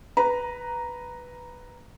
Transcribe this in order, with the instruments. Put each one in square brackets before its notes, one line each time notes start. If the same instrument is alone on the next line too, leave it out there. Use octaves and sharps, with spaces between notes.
[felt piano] B4 A#5